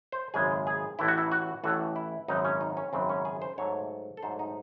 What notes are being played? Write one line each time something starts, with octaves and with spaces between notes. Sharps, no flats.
C5
G#1 F#2 C#3 G#3 G#4
G#4
A1 A2 E3 A3 E4
F#4
E4
F#4
A1 A2 E3 A3 F#4
E4
G#1 F#2 C#3 F#3 D#4
C#4
D#4
C#4
G#1 F#2 C#3 F#3 C4
C#4
G#4
C5
G#2 F#3 A3 C#5
A4
G#2 F#3 A3 C5
D#4